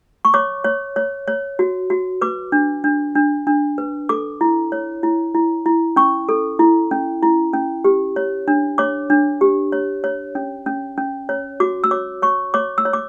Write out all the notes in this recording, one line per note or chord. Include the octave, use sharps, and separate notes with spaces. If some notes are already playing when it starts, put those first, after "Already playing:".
C#6
C#5 D6
C#5
C#5
C#5
F#4
F#4
B4 D6
D4
D4
D4
D4
B4
A4 D6
E4
C#5
E4
E4
E4
C#4 C#6
A4
E4
C#4
E4
C#4
G4
C#5
D4
C#5 D6
D4
G4
C#5
C#5
C#4
C#4
C#4
C#5
F#4 D6
E6
C#5 D6
C#5 C#6
C#5 D6
E6
C#5
D6